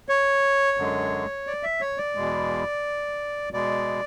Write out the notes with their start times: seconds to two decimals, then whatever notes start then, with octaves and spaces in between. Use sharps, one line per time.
0.09 C#5
0.77 F#2 D3 G#3
1.47 D5
1.63 E5
1.81 C#5
1.98 D5
2.15 E2 B2 G#3
3.53 B2 G#3 D5